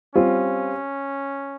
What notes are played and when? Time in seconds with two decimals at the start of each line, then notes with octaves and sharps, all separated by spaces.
0.15 G3 C4 C#4 F4